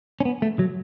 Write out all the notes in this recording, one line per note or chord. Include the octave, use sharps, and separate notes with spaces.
C#4
B3
A3
F#3